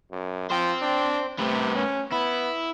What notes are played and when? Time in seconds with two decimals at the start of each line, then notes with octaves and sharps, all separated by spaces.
0.12 F#2
0.51 F3 C5 G5
0.82 D4
1.39 C3 A3 B3
1.76 C#4
2.12 B3 E4